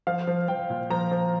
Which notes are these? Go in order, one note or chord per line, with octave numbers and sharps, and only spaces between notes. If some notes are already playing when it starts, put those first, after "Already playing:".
F3 F5
F3
F3 G5
A#2
F3 A#5
F3